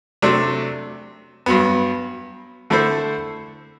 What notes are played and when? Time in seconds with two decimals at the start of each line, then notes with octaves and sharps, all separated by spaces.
0.22 C3 F#3 A3 D4
1.46 G2 F#3 B3
2.70 D3 A3 E4 A4 C5